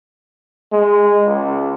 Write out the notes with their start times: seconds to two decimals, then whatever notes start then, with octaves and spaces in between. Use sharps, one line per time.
0.72 G#3
1.26 C#2